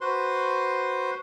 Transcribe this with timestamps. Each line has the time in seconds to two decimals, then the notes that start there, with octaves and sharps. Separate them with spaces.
0.01 F#4 B4 C5 C6